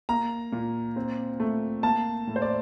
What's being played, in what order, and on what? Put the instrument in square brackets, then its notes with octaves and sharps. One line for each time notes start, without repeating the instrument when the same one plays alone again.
[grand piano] A#3 A#5
A#2
C4
A3
A#3 A5
A2
C5
D5